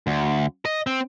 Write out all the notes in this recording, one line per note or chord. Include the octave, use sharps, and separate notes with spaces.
D2
D#5
C4